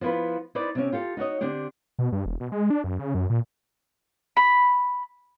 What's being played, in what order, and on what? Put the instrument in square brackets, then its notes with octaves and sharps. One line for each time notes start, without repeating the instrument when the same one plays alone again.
[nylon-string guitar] F3 B3 E4 F4 B4
D#4 E4 B4 C5 D5
C3 C4 C#4
F4 G4 A4
D#4 F#4 C#5 D#5
D3 C4 D4 G4
[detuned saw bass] B2
G2
E1
B2
G#3
D4
F#2
C#3
F#2
A#2
[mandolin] B5